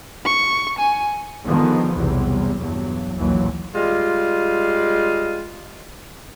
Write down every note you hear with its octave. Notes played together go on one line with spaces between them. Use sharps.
C#6
G#5
D3 D#3 F3 G#3 B3
B1 E2 C3 G3
E2 G2 F#3
A1 D#2 A#2 E3 F#3
G3 G#3 F4